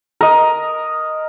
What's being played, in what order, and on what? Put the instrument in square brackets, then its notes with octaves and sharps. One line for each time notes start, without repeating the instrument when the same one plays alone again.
[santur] A#4 D#5